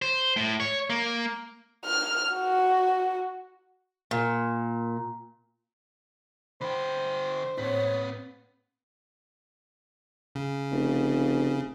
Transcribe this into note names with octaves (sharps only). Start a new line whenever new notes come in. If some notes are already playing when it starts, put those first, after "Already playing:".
C5
A2
C#5
A#3
F6
F#4
A#2
D3 C5 G5 B5
A2 C4 B4 C#5
C#3
F1